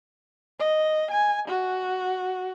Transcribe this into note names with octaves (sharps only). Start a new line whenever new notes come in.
D#5
G#5
F#4